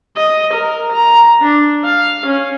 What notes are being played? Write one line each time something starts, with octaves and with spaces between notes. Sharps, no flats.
D#5
A#4
A#5
D4
F5
C#4